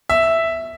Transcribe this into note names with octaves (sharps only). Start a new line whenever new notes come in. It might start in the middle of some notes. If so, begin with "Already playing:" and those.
E5